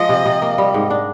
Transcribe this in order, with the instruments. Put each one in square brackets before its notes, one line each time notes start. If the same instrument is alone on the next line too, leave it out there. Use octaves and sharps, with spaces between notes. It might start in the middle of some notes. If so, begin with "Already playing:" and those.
Already playing: [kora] F3 G#3 [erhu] D#5
[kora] C3
C3
A#3
G3
G#2
D4